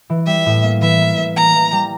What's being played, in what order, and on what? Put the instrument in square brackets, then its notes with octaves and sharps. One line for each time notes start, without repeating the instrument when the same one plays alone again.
[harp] E3
[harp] G3 [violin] E5
[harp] A2
A#3
[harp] E3 [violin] E5
[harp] A#3
A#3
[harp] A#3 [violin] A#5
[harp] E3
G3